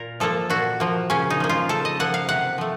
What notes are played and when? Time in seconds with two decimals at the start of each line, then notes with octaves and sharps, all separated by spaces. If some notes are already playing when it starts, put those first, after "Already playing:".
Already playing: A#2 A#4
0.20 F3 A#3 A4
0.50 A#2 F#4
0.80 F3 A#3
1.10 C#3 C#4
1.30 D#4
1.40 F3 A#3
1.49 F4
1.69 C#3 A4
1.85 D#5
2.00 F3 A#3 F#5
2.14 F5
2.29 C3 F#5
2.58 F3 A3